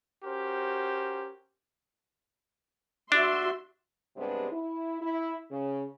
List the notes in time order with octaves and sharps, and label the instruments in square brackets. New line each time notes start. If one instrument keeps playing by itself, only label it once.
[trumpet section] C#4 F#4 G4 A#4 C5
[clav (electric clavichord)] D4 [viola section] F#4 E5 C6
[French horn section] G2 C3 G#3 B3 C4 D4
E4
E4
C#3